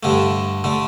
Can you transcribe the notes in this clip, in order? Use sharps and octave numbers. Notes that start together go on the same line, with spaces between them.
G2 D3 A3
D3 A3